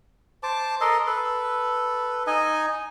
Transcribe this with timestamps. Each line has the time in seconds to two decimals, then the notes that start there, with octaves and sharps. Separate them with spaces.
0.43 C5 A5 D6
0.81 A4 A#4 D#5 C6
1.07 A4 B4
2.27 D#4 D#5 G#5